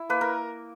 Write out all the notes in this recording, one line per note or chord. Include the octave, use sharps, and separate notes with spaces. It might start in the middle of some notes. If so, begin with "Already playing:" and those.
Already playing: E4
A#3 B4
A#4